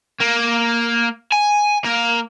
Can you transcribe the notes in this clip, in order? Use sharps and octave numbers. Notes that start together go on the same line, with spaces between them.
A#3
G#5
A#3